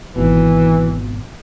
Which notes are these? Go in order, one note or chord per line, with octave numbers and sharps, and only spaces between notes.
G#1 B2 E3